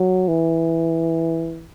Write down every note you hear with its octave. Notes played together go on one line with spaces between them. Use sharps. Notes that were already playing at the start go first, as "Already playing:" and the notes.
Already playing: F#3
E3